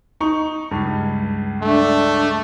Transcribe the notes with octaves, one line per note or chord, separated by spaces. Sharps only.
D#4 C#6
C#2 G2
A3 D4